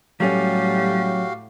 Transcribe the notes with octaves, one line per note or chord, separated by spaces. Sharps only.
A2 F#3 G3 A3 C#4 F#4 G4 F5